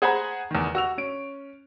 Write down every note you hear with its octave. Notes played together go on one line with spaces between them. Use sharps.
G#4 C5 F#5 G#5 A#5 B5
E2 D#3
F#4 E6 F7
C#4 D7